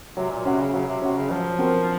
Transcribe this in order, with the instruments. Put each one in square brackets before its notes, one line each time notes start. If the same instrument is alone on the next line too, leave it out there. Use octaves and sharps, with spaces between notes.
[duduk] C3 [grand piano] F#3
[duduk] A#2
[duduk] C3 [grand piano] C#4 F#4
[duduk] C#3
[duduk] C#3 [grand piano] F#3
[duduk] C3
[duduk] C3 [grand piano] C#4 F#4
[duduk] C#3
[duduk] F3 [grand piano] F#3
[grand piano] C4 F#4 A#4